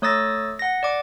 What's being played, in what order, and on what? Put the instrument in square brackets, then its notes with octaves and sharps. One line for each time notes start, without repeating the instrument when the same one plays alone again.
[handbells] A3 C#5 D#6 E6 A6 A#6
F#5 A#6
D5 D6